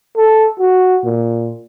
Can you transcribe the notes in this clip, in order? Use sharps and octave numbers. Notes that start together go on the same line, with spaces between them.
A4
F#4
A#2